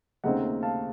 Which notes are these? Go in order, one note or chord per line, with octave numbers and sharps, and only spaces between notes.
D#2 C#3 A3 C4 D#4 D#5 F#5
F5 A5